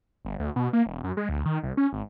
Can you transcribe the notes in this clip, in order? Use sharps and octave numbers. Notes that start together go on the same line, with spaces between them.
G1
D2
B2
A#3
E1
F#2
G#3
D2
D#3
C2
C#4
G#1